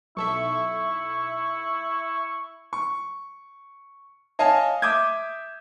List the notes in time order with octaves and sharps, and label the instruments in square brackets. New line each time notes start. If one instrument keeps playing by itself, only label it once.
[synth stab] B1 A4 E5 [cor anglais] E4 [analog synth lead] C#6
[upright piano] C#6
C#5 D#5 F5 G#5 A5
E5 D6 D#6 G6 G#6